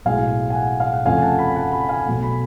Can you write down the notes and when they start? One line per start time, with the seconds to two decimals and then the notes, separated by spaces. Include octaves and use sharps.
0.05 B1 A2 G#3 F5 G#5
0.50 G#5
0.55 F#5
0.80 F5
0.93 F#5
1.05 F1 F2 C#3 F3 A3 F5 G#5
1.17 G#5
1.22 F#5 A5
1.39 G#5 B5
1.56 F#5 A5
1.72 G#5 B5
1.89 F5 G#5
2.06 B1 B2 A3
2.23 G#5 B5